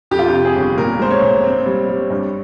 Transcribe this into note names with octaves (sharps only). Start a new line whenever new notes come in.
F2 G4
F4
C3 G4
G#4
G1
A#2 A#4
G#3 C5
C#5
A#2
C4
G3
G3
G2